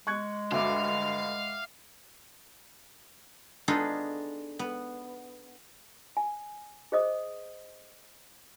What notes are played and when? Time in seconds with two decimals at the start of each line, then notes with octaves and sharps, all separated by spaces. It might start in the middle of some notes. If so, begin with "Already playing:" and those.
0.07 G#3 C#6 F#6 G#6
0.52 D2 G2 F#4 E5 F5 D6
3.68 B3 D4 D#4 F4 G#4 A4
4.59 B3
6.17 G#5
6.92 G#4 C5 D#5 D#6